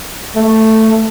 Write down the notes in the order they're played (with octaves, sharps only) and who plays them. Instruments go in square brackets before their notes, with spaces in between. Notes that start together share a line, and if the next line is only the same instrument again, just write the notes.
[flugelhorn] A3